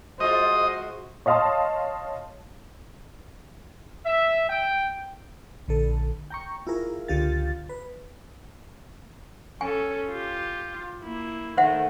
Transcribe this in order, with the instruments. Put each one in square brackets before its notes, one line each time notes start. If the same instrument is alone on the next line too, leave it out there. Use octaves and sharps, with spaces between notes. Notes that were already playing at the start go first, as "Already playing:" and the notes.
[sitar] G#3 F4 [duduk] F#4 [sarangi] C5 [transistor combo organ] D#5
[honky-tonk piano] C#5 D#5 F5 A5 C6 D#6
[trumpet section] E5
G5
[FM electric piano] A#1 D3 A4
G5 A#5 C#6
E4 F4 G#4 A#4
C#2 D3 F4 G4 F5 A6
B4
[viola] C#4 A4 [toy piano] G#5
[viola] F4 G4
A#3 E4
[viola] D#3 A3 [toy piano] C5 E5 F#5